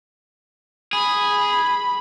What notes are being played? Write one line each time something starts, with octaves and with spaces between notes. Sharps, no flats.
G#4 B5